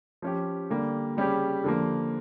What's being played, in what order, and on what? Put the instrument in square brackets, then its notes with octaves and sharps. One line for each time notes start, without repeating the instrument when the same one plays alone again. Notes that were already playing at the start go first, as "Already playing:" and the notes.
[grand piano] F3 C#4 G4
D3 G3 A#3
C#3 G3 C#4 G4
D3 F3 A#3